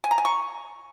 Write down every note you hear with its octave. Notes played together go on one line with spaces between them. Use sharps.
G#5
A#5
G#5
C#6